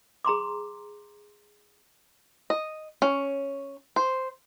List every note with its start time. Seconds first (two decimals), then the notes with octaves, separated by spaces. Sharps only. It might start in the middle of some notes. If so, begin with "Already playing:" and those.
0.25 G#4 A#5 C6 D6
2.50 D#5
3.02 C#4
3.96 C5